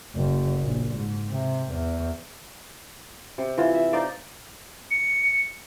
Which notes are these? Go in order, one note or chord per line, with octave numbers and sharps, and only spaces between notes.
F#1
A#1
G#2
C3
E2
C3
E3 F4
E5
D#4 C5 D5 F5
C#7